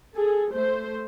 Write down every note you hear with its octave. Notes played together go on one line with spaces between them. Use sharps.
G#4 A4
A3 C5